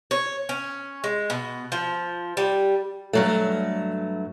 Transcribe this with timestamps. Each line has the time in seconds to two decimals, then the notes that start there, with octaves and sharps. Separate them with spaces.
0.11 C#5
0.49 C#4
1.04 G#3
1.30 B2
1.72 F3
2.37 G3
3.13 G2 F#3 A3